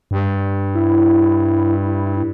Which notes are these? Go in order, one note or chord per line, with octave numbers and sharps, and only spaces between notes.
G2
E4